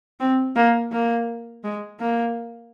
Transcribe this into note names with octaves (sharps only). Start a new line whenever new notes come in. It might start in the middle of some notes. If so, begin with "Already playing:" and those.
C4
A#3
A#3
G#3
A#3